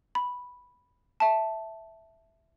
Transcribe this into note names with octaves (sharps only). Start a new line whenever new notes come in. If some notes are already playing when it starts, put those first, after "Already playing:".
B5
E5 A5